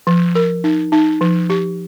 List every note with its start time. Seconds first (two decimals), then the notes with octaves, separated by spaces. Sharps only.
0.07 F3
0.35 A#4
0.64 D#4
0.92 D#4
1.21 F3
1.50 G4